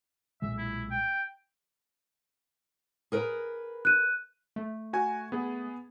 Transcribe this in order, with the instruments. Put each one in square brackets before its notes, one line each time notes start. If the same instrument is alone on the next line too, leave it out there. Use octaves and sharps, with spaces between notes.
[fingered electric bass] B1 A#2 G#3 [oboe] E5
[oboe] E4
G5
[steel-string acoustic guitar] G#4 A#4 B4
[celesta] F#6 D#7
[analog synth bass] A3
[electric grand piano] F#4 G#5 G#6
B3 G#4